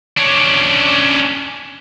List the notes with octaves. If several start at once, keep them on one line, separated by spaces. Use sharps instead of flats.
C#4 D4